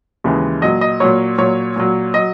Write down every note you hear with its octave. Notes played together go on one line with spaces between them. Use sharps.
D#2 C#3 E3 G#3
A#2 F#3 D#5
D#5
A#2 F#3 C#5
A#2 F#3 C#5
A#2 F#3
F#3 D#5